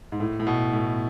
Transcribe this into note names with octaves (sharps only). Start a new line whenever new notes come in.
G#2
A2
A2
B2
A2